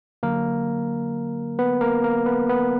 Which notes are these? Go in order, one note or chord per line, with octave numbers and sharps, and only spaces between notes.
D3 F#3 A#3 A#4
B3 B4
A#3 A#4
A#3 A#4
B3 B4
B3 B4